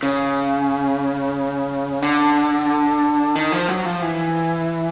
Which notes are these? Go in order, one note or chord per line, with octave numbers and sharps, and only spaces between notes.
C#3
D3
D#3
F3
F#3
F3
E3